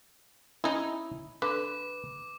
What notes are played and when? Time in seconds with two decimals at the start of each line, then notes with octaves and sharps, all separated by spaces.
0.64 C#4 D#4 E4
1.42 D3 B4 D6